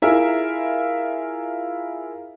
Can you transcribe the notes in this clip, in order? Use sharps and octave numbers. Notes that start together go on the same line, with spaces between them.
E4 F4 G#4 A#4 E5